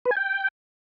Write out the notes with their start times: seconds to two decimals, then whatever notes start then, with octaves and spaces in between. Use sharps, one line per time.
0.05 B4
0.11 G#5
0.17 G5